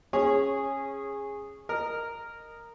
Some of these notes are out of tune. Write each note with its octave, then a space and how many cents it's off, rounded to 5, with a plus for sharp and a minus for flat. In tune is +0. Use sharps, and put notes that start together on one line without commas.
C#4 -20 G#4 -10 C#5 +0
A#4 -5 D#5 -15